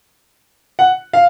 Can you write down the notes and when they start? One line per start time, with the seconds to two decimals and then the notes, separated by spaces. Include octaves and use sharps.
0.79 F#5
1.13 F5